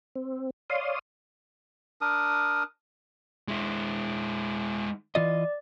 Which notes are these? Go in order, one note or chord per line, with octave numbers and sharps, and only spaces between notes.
C4
C#5 D5 F5 C6 D#6
D4 A#4 D#6
G#3 E4
E3 F4 D5 D#5